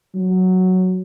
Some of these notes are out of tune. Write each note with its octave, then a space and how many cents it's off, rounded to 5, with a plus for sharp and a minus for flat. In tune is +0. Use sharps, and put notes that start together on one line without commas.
F#3 +0